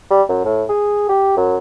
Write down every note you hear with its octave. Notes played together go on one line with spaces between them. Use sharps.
G3
F#2
A2
G#4
G4
F#2